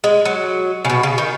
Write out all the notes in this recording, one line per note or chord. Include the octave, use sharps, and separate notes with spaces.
G#3
F#3
C#3
B2
C#3
D#3